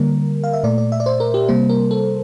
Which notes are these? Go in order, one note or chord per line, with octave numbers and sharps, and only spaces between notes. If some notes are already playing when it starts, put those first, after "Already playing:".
Already playing: D3 G3 A#3 A#4
F5
E5
A#2 A3 D5
D5
E5
D5
C5
A#4
G4
C3 G3 A#3 C5
A#4
A4